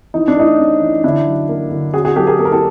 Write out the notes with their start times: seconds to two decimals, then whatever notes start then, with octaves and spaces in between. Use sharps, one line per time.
0.14 E3 D#4
0.28 D4
0.37 A3 D#4
0.59 C#4
0.82 E3
1.04 D3 D4 E4
1.26 F#3
1.49 A#3
1.71 D3
1.94 C#4 F#4 G#4
2.05 F#4 G#4
2.16 F#3 G4 A4
2.27 G#4 A#4
2.39 A#3 A4
2.45 A#4
2.52 G4 A4